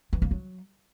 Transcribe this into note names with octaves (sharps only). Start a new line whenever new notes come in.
E3
A#3
F#3